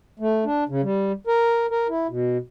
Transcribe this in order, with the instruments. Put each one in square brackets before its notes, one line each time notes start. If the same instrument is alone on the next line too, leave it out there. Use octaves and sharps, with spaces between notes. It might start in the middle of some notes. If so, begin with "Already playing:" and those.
[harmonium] A3
D4
C#3
G3
A#4
A#4
E4
B2